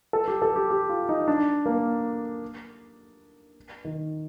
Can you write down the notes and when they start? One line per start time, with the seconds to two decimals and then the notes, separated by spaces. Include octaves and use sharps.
0.13 A4
0.28 G4
0.42 A4
0.56 G4
0.70 G4
0.89 F4
1.09 D#4
1.28 D4
1.66 A#3
3.85 D#3